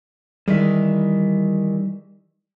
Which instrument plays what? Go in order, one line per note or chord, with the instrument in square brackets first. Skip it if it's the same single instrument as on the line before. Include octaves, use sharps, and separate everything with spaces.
[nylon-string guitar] D#3 E3 G#3 [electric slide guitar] G3 E5